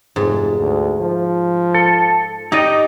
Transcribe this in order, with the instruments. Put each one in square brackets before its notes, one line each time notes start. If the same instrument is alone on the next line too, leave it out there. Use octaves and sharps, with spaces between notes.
[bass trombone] F1 [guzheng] G#2
[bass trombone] D2
F3
[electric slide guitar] A4
[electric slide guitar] D#4 D#5 [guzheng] G4 D5